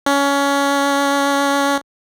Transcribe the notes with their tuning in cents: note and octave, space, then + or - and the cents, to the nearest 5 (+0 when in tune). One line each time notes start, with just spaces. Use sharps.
C#4 +20